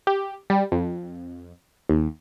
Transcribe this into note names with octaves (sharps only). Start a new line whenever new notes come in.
G4
G3
F2
D#2